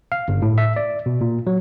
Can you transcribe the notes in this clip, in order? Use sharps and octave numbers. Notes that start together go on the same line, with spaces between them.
F5
G1
A2
E5
D5
B2
A#2
F#3